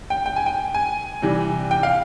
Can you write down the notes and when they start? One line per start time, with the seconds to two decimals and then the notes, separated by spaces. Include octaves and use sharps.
0.10 G5
0.26 G5
0.36 G#5
0.46 G5
0.74 G#5
1.22 C3 E3 G3
1.71 G5
1.83 F5